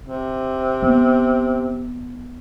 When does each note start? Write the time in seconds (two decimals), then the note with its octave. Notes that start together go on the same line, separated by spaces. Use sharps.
0.05 C3
0.82 B3